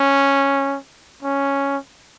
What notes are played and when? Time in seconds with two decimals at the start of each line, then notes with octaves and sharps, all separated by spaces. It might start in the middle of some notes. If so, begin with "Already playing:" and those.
Already playing: C#4
1.23 C#4